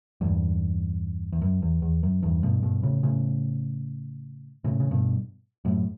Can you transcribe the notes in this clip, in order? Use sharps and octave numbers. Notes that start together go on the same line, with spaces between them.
E2 G2
E2
F#2
E2
E2
F#2
E2 G2
G2 B2
G2 B2
A2 C#3
A2 C#3
A2 C#3
C#3
G2 B2
F#2 A2